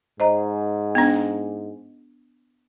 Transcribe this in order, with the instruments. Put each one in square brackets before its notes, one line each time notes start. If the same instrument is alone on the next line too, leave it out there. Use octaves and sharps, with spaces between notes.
[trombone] G#2 [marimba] C5 D#5 A#5
[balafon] B3 D4